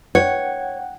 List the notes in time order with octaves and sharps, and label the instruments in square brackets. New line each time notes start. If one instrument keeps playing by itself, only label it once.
[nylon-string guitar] C#5 [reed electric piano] F#5 G5